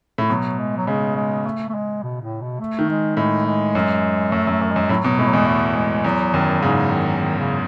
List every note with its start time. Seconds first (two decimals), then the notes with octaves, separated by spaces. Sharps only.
0.18 A2
0.30 B2 F#3
0.58 G#3
0.77 F#3
0.87 C#3 G#3
1.16 G#3
1.45 A3
1.69 A3
1.74 G#3
2.02 B2
2.21 A2
2.41 B2
2.60 A3
2.79 D#3
2.89 G#3
3.17 A2 G#3
3.46 G#3
3.75 F#2
4.32 F#2 A3
4.47 F#2
4.51 A3
4.61 F#2
4.71 G#3
4.76 F#2
4.89 A2 F#3
5.04 B2 F#3
5.19 A2 G#3
5.27 F#3
5.33 E2 G#3
5.47 A3
5.76 G#3
6.04 E2 F#3
6.34 F#2 D#3
6.62 G#2 C#3
6.91 D#3
7.19 D#3
7.38 C#3